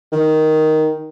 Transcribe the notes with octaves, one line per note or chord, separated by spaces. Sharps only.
D#3